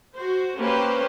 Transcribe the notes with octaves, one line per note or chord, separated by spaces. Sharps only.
F#4 C5
A#3 C#4 G4 B4 C5